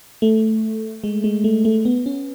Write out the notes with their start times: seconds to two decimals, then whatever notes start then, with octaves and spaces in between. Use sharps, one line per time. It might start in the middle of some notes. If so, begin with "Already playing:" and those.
0.22 A3
1.04 G#3
1.24 G#3
1.44 A3
1.65 A3
1.85 B3
2.06 C#4